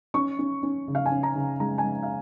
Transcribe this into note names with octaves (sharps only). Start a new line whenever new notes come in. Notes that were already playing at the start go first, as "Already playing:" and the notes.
C#4 C#6
C#4
C#4
C#3
F5
G#5
C#4
A#5
C#3
G#3 A#5
G#5
G#3
F5